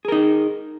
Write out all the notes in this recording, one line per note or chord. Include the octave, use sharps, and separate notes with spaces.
D#4 G#4 A#4